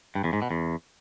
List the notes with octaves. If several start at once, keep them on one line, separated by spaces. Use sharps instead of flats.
G2
E2
G#2
B2
E2